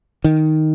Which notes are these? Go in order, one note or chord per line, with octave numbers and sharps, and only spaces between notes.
D#3